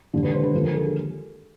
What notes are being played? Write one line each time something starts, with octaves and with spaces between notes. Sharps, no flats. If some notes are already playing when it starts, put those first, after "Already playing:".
E1 D#2 D3
B4
C5
B4
D#2 D3 F3 A4
A#4
A4
G#4